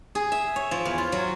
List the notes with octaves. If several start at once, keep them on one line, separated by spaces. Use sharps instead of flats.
G#4
E5
C#5
F3
E2
F4
F#3